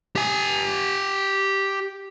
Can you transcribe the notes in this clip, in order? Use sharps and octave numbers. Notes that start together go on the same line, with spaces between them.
G4 G#5